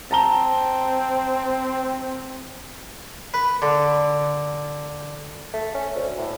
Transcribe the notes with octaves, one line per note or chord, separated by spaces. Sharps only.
C4 A5 A#5 G7
B4
D3
A3
C#4
D2
A2